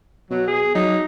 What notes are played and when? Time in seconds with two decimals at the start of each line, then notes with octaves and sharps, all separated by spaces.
0.31 B2 F#3
0.47 G#4
0.75 F#3 D#4